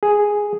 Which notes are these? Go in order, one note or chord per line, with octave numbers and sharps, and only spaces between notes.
G#4